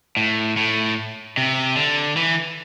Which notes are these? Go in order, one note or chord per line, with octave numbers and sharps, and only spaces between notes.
A2
A2
C3
D3
E3